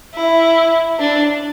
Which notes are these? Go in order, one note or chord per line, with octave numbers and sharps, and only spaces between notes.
E4
D4